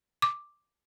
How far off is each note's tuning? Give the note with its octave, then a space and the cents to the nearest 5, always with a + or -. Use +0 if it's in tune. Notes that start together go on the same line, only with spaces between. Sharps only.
D6 +5